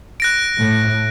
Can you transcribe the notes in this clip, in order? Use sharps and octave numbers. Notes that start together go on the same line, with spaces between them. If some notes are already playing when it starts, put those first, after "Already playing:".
F#6 A#6 D7
A2